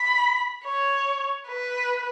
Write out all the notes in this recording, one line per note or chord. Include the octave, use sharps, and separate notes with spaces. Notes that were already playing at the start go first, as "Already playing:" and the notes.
Already playing: B5
C#5
B4